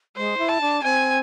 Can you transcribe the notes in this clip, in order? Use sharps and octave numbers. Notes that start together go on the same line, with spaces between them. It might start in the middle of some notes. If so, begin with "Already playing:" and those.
G#3 C5
E4
A5
D4
C4 G#5